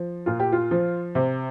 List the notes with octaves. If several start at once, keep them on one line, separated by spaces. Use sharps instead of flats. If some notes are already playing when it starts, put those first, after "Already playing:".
Already playing: F3
A#2 F4
G4
F4
F3
C3